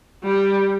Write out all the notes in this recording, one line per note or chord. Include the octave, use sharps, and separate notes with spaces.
G3